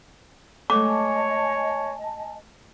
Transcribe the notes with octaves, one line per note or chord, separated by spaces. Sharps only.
G#3 A3 A4 C#5 D#5 G#5 A5 D6